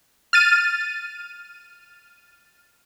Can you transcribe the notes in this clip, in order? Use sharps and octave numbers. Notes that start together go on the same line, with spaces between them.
F6 A6 D#7